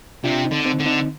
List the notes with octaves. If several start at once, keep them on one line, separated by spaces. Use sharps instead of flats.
C3 D4 F4
C4 D#4
D3
C4 D#4
D3
C4 D#4